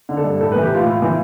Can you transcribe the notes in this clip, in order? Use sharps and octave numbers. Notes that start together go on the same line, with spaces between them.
D3
A4
G2
A2 A4
E3 B4
G4
A2 F4
A2 F4
E3